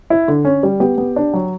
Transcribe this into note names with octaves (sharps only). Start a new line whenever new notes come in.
E4
D3
C#4
G3
B3 G4
B3
D4
F#3